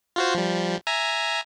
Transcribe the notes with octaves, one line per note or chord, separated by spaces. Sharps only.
F4 F#4 C5
F3 G3
E5 G#5 A#5